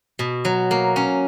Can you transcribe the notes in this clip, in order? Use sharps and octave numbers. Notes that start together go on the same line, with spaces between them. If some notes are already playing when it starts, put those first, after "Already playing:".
B2
F#3
A#3
C#4